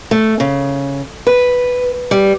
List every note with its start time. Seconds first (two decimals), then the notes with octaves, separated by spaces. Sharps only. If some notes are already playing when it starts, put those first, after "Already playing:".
0.11 A3
0.40 C#3
1.27 B4
2.11 G3